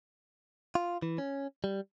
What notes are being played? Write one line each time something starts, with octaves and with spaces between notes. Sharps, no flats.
F4
E3
C#4
G3